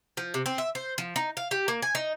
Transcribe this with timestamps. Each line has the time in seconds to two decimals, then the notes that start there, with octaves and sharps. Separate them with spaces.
0.17 F3
0.34 C3
0.46 C4
0.58 E5
0.75 C5
0.98 F3
1.16 D#4
1.37 F5
1.51 G4
1.68 A#3
1.82 G#5
1.95 D#4